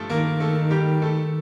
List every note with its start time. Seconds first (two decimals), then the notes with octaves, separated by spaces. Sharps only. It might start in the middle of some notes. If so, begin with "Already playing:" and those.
Already playing: G2 F3 G3 A3 A4
0.10 D#3 A#3 A#4
0.40 A3 A4
0.71 G3 G4
1.02 A3 A4